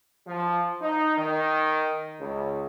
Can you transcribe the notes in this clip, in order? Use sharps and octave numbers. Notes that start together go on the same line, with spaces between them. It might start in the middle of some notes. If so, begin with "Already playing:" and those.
F3
D#4
D#3
C#2